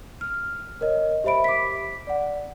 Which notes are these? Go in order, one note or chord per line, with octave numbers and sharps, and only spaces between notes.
F6
A#4 C#5 D#5
G4 C5 E5 B5 D7
D6 B6
D5 F#5